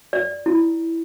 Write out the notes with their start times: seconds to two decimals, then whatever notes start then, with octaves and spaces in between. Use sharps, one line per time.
0.13 D5
0.46 E4